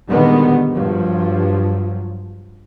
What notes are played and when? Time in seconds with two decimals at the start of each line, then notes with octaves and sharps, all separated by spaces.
0.10 A#2 D3 D#3 G3 G#3 B3
0.74 G2 F3 F#3